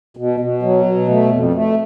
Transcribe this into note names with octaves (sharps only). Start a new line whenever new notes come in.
B2
B2
F#3
B2
A3
F2
A3